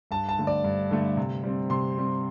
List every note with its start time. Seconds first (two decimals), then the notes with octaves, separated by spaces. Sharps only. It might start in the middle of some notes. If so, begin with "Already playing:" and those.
0.11 G2 A5
0.29 A5
0.38 D3 A3
0.47 D5
0.64 G2
0.91 D3 A3
1.17 C3
1.44 G3 C4
1.70 C3 C6
1.97 G3 C4